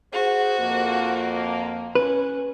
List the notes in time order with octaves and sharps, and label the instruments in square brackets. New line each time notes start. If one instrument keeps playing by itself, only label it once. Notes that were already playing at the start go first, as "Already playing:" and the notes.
[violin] F#4 [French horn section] G#4 C5
[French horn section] F2 A#3
[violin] C#4 [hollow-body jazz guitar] B4